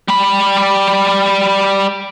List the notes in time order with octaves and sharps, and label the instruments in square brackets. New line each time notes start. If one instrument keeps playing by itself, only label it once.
[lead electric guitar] G3 B5